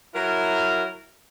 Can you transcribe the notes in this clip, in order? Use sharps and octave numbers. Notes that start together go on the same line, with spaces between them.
F#3 E4 A#4